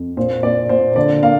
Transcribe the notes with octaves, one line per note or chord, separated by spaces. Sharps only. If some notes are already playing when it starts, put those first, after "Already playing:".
Already playing: F2
A#2 C5
A#2 D5
A#2 C5
D3 D5
A#3 F5